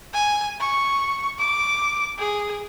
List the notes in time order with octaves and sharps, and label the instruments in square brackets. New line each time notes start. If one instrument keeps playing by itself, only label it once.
[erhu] G#5
C#6
D6
G#4